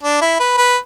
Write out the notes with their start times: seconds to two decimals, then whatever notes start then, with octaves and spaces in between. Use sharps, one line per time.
0.04 D4
0.22 E4
0.40 B4
0.57 B4